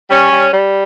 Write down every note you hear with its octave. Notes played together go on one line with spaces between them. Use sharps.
G3 C#4
G3
G3